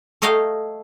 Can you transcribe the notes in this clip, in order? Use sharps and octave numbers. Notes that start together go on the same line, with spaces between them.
A3 C#5 D#5 F5 G5 A#5